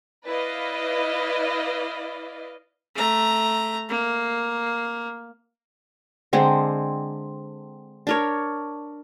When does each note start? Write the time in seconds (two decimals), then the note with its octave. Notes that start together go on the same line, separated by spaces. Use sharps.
0.25 E4 B4 D5 D#5 F5
2.95 A3 A#5
3.89 A#3
6.33 D3 G#3 C4
8.07 D4 A#4 C#5